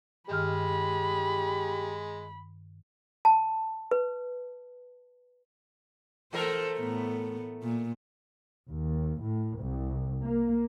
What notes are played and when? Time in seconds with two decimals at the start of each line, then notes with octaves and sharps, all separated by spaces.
0.30 G2 D#3 G#3 G4 B5 F6
3.25 A5
3.91 B4
6.33 E3 A3 A4 A#4 C5
6.78 A2 B3
7.63 A#2
8.69 D#2
9.24 A2
9.61 C2
10.22 A#3